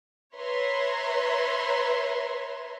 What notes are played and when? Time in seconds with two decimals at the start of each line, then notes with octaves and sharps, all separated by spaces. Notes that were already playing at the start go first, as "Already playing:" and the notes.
0.35 B4 C#5 E5 A#5 C6